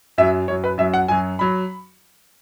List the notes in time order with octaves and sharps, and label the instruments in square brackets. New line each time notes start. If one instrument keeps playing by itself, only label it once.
[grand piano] F#2 F#3 E5
F#2 F#3 C#5
B4
F#2 F#3 E5
F#5
F#2 F#3 G#5
F#3 B5